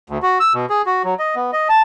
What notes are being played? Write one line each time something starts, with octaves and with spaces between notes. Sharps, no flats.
D2
F#4
E6
B2
G#4
F#4
F#3
D#5
B3
D#5
A5